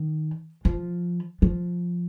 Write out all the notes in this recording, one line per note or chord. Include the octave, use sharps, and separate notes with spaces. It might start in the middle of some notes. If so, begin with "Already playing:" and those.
Already playing: D#3
F3
F3